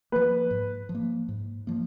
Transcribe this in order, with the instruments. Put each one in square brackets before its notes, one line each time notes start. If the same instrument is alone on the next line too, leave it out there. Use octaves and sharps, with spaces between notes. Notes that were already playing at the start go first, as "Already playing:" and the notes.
[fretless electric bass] F3 A#3 [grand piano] B4
[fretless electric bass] G#2
F3
A#3
G#2
F3 A#3